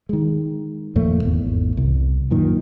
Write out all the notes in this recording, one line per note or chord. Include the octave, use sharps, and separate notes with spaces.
D#3 G#3
F2 A#2 A3
G#1 E2
C2
F#2 A#2 D#3